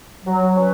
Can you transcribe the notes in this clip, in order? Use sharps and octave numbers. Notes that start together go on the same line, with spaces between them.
F#3
C#4 B4